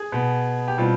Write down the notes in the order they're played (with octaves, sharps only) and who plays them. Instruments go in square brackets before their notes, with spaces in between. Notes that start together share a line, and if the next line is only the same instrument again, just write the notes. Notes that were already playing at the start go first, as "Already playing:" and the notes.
Already playing: [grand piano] G#4
B2 B3
G4
B2 G3 C4 F4